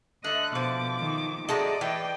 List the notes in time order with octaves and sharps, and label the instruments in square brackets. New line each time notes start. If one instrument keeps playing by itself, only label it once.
[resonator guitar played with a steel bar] D3 A3 [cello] D#5 [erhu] F#6
[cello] B2 [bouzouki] F3 [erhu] D6
[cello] D#3
[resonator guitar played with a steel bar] C3 A3 F#4 [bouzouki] G#3 A5 A#5 [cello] D5 D#5
[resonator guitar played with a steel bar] A2 [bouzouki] E3 [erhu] G5